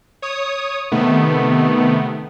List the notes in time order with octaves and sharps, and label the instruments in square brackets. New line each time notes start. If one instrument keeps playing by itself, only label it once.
[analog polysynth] C#5 D#6
C3 D#3 A3 B3